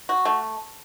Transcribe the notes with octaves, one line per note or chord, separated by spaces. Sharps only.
F#4
A3